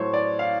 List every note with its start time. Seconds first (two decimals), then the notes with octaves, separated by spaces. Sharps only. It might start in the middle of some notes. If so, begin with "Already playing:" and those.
Already playing: A2 F#3 A3 C5 C#5
0.14 D5
0.39 F5